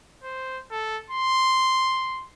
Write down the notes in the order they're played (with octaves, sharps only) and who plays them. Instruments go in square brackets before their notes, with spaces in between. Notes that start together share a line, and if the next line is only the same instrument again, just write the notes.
[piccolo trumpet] C5
A4
C6